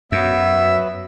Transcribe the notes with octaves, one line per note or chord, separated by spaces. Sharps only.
F#2 F#3 B3 E5